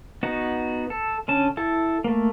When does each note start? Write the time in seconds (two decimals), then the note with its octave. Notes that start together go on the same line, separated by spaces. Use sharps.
0.23 B3 D#4 F#4
0.90 A4
1.28 D3 C#4 A5
1.57 E4 A4
2.04 A3 A#3